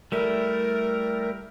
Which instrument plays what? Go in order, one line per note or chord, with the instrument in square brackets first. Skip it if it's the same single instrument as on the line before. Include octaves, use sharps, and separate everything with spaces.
[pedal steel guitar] G3 A3 E4 [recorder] A#4